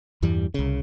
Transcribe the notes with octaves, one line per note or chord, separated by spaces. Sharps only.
E2 G2 E3 G3
C2 C#3